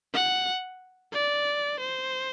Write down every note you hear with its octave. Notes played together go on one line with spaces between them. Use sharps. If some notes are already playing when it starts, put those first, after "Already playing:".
F#5
D5
C5